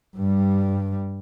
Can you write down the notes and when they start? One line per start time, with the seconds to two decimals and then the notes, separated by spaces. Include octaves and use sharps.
0.16 G2 G3